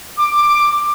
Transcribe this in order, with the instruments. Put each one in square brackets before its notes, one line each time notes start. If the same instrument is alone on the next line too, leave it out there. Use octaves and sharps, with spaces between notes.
[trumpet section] D6